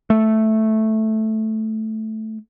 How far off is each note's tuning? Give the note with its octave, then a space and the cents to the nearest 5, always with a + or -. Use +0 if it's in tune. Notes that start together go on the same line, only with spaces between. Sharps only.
A3 -5